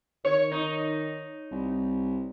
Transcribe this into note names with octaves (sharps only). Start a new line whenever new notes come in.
D#3 C#5
D#4
C2